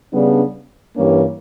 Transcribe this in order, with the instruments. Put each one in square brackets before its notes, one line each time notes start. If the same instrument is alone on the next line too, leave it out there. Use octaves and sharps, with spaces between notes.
[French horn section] C#3 G3 B3 D4
G2 E3 G3 A#3 C#4